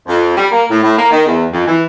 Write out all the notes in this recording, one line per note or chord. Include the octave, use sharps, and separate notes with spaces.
F2
G3
A#3
A2
A2
A#3
D#3
E2
F2
E3